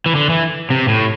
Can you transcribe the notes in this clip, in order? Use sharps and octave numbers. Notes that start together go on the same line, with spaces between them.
E3
D3
E3
C3
A2